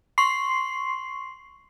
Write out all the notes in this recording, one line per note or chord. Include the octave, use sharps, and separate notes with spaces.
C6 C#6 C7